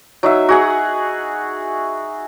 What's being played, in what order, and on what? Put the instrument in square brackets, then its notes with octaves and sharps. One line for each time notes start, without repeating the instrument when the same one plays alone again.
[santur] F#3 D#4 E5
F#4 G#4 F#5